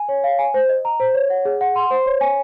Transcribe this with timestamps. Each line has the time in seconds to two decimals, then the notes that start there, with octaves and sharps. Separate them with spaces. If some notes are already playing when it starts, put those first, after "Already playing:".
Already playing: G#5
0.09 C#5
0.24 F5
0.39 G#5
0.54 C5
0.69 D#5
0.85 A#5
1.00 C5
1.14 C#5
1.30 F#5
1.45 G#4
1.61 F#5
1.76 C6
1.90 C5
2.06 C#5
2.21 G#5